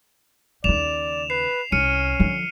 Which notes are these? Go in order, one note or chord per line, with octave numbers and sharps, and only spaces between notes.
D#2 C#3 D5 E7 F7
B4 C7
C2 C#4 F6 C#7 D#7
D3 F3